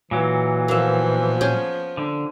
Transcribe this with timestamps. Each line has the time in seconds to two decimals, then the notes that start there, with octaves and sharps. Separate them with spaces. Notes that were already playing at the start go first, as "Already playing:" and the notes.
0.11 A#2 E3 F#3
0.68 F3 A#3 B3 E5
1.41 C#4 G#4 G5
1.97 D3